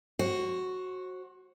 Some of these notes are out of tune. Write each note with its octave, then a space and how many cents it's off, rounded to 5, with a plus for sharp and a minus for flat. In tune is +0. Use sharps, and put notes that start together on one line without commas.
F#4 +0 C5 +40